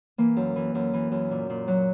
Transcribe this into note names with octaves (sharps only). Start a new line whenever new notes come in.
E3 A#3
F#2
E3
F#2
E3
F#2
A#2
A#2
F#3